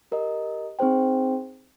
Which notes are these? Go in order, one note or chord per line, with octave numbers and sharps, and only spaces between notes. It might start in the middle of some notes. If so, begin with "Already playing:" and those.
G4 A#4 D#5
C4 D#4 G#4 C5 G5